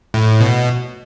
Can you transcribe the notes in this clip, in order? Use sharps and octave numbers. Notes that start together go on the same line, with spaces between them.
A2
B2